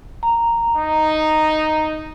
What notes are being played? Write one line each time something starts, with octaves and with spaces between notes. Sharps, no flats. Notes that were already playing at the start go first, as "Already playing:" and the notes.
A#5
D#4